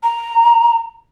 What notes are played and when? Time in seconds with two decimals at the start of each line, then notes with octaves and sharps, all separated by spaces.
0.03 A#5